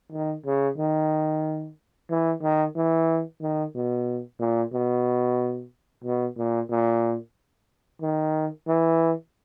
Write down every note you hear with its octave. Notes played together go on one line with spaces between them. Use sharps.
D#3
C#3
D#3
E3
D#3
E3
D#3
B2
A#2
B2
B2
A#2
A#2
D#3
E3